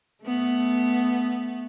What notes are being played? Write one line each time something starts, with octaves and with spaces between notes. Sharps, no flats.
A3 B3